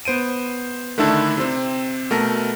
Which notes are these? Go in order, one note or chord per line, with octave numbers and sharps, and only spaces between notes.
B3 C5 D7 D#7
D3 D#3 A3 D4 E4 A4
C3 C4
B2 A3 A#4 A5 A#6